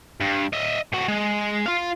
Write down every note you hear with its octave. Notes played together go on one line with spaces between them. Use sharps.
G2
D#5 E5
A2 F#4
G#3
F4 F5